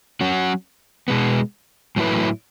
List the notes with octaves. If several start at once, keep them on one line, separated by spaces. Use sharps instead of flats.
F#3 C#4 F#4
B2 G#3 B3
A2 F#3 A3 E4 B4